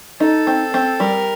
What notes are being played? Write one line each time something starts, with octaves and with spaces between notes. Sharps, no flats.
D#4 A4
C4
C4
G3 A#4